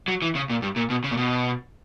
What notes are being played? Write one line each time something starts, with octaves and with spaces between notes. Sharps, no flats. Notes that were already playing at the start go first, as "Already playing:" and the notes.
F#3
E3
C#3
A#2
G2
A#2
B2
C#3
A#2
B2